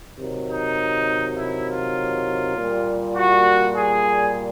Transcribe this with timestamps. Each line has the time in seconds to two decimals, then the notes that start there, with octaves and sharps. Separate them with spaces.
0.17 C3 D#3 F#3
0.48 D#4
1.37 E4
1.67 F4
2.56 A#2 G3
3.15 F#4
3.76 G#4